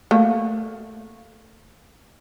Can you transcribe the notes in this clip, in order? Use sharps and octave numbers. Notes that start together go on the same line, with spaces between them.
A3 A#3